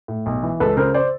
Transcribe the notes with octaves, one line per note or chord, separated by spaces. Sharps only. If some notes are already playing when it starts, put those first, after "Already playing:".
A2
B1
E3
C#2 A4 B4
C#3 A#4 C5
C5 D5